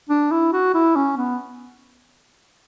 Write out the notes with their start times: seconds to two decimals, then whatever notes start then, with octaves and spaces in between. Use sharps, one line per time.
0.10 D4
0.32 E4
0.53 F#4
0.75 E4
0.96 C#4
1.18 B3